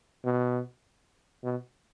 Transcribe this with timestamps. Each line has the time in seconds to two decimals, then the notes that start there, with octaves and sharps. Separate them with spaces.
0.25 B2
1.44 B2